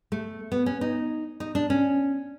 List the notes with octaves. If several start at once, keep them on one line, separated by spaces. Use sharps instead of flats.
A3
B3
C#4
D#4
D#4
D4
C#4